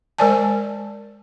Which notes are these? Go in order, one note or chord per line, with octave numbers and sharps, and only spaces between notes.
G#3 A#4 C5 D5 G#5 A5